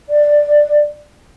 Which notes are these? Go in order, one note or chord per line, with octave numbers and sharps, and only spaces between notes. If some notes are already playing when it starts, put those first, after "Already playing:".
D5